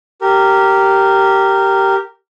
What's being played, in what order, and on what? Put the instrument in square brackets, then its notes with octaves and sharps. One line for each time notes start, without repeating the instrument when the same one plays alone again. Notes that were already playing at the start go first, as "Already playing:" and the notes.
[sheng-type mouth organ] G4 A#4